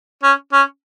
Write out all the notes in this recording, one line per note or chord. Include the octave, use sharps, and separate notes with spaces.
C#4
C#4